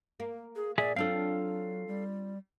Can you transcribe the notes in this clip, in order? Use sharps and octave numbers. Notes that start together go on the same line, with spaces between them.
A#3
G#4
A#2 G#4 D5 E5 G#5
F#3 C4 D4 F4 A4 F5
G3